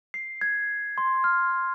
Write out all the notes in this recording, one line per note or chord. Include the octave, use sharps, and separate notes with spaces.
C7
G#6
C6
F6